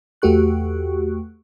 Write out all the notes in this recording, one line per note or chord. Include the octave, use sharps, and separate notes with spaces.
E2 A3 F#4 G4 C#6 F#6